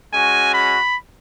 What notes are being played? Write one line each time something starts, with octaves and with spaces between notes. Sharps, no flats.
G#3 C#4 F#4 G#5
B5